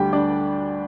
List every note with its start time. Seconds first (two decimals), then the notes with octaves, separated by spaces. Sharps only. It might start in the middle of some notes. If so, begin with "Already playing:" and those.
Already playing: D2 D3 G3 G4 G5
0.13 D4 D5